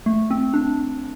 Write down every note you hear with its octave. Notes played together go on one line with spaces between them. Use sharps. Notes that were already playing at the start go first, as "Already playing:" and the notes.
A3
C4
D4